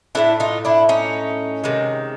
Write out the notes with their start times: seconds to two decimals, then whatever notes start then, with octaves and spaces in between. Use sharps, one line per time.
0.15 A2 F#3 A3 D4 E4
0.40 D#4 F4
0.65 D4 E4
0.89 C#4 D#4
1.64 C3 D#3 G#3